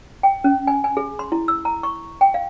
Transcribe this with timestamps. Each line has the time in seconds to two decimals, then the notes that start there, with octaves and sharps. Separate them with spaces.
0.23 G5
0.44 C#4
0.67 G#5
0.84 G#5
0.97 G#4
1.19 C6
1.32 E4
1.48 E6
1.65 A#5
1.83 C#6
2.21 G5
2.34 F5